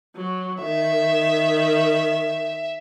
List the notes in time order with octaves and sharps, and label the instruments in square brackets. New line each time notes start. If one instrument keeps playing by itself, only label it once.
[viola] F#3
[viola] D#3 [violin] E5